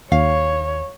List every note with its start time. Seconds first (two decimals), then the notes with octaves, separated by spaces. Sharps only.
0.12 D#2 C#5 F5